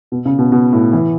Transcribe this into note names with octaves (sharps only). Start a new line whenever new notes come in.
B2
C#3
B2
B2
A2
E3